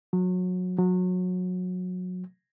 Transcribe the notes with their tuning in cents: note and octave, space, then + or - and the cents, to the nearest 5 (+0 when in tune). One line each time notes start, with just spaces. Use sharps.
F#3 -25
F#3 -25